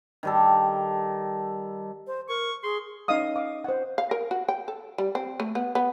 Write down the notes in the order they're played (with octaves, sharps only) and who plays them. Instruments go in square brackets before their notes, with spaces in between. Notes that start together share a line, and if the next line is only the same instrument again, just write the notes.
[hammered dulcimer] D#3 G3 A4
[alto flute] C5
[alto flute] A#4 [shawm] C#6
[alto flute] G#4 [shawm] C6
[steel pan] C#4 D#4 C#5 D#5 F5 D#6
F5 D6
C5 F#5
[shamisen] F5
A#4
F#4
G5
A4
G3
C4
A3
B3
B3